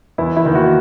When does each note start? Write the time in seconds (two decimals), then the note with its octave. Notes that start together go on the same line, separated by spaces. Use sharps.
0.18 E2 E4
0.36 E4
0.46 D#3 A#3
0.55 F#4